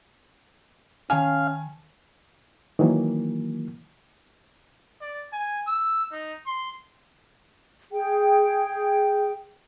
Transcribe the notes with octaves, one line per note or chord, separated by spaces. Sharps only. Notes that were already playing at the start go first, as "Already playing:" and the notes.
D#3 C#4 F5 G#5 A5
D#3 E3 F#3 A#3
D5
G#5
E6
D#4
C6
G#4 G5